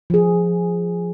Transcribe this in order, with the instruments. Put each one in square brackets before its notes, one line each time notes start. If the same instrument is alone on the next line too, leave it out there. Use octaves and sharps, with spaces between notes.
[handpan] F3 G#4